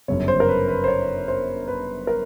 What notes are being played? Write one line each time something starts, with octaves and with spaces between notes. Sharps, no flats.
G1 F#2 C#3 C#5
C5
A#4
B4
B4
C5
C#5
C5
B4
A#4